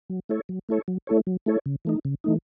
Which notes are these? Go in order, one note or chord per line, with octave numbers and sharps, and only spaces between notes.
F#3
A3 E4 A4 C#5
F#3
A3 E4 A4 C#5
F#3
A3 E4 A4 C#5
F#3
A3 E4 A4 C#5
C#3
E3 A3 D#4
C#3
E3 A3 D#4